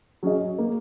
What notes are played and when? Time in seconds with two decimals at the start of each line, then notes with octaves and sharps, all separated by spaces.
0.23 F#3 C#4 G#4 D#5
0.58 A#3